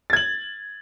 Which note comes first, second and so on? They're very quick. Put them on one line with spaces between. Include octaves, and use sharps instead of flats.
A6 G#6 F#7